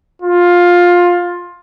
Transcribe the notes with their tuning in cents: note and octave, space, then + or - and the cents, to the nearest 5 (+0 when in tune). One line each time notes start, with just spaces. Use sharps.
F4 +15